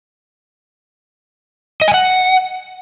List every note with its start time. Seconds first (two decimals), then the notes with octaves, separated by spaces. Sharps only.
1.82 D#5
1.88 G#5
1.94 F#5